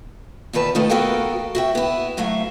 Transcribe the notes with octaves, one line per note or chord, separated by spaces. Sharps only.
E2 A#2 D#3 B4 A5
C3 D#3 A3 B3 D#4 F4
B3 F#4 A4 A#4 F5 G5
F#4 E5 G5
B3 E4
D2 F#3 A3 E5 F5